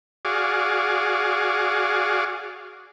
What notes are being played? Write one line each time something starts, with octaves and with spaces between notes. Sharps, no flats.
F#4 G#4 D5 F5